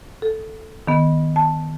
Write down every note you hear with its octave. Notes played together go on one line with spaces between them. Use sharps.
A4
D#3 B3
A5